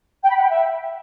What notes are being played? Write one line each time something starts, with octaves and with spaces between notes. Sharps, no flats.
G5
B5
F#5
G5
E5